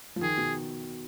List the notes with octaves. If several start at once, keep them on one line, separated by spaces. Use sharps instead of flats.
F3
D#3 G#4
B2